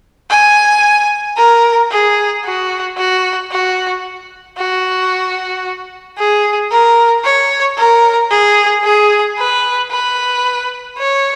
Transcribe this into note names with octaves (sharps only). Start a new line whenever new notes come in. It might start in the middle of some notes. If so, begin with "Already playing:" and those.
G#5
A#4
G#4
F#4
F#4
F#4
F#4
G#4
A#4
C#5
A#4
G#4
G#4
B4
B4
C#5